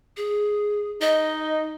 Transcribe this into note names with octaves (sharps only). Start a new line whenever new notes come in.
G#4
D#4 D#5